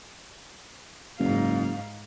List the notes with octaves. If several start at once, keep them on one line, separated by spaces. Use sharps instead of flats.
F#1 G#2 F5